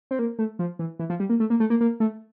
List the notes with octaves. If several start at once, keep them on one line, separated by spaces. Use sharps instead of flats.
C4
A#3
A3
F3
E3
E3
F3
G3
A#3
A3
A#3
A3
A#3
A#3
A3